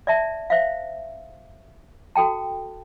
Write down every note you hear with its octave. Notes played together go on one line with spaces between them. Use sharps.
D5 E5 A5
C5 E5 F5
F#4 A4 G5 A5